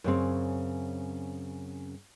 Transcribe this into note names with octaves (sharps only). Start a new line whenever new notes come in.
F#2 C#3 C4